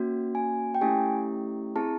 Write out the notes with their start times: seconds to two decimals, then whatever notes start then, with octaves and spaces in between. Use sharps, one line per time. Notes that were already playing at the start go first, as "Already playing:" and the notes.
Already playing: A#3 C#4 F#4
0.35 G#5
0.75 G5
0.81 A3 C#4 E4 G4 G#5
1.76 C4 E4 G#4 A5